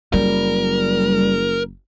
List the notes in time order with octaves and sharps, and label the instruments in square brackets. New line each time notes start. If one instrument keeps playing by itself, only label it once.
[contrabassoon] F#1 [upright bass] F#3 [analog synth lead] G3 [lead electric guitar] A#4